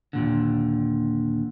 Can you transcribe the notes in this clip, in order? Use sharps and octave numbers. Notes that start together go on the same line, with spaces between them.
D#2 A#2 D3